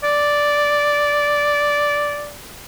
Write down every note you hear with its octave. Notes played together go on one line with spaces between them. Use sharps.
D5